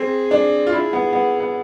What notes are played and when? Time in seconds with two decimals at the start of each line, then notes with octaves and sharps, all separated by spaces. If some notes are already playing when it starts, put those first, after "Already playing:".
Already playing: C4 G#4
0.31 D4
0.67 F4
0.72 E4 G#4
0.93 B3
1.13 B3
1.40 B3